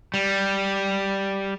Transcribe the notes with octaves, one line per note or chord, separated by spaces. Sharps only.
G3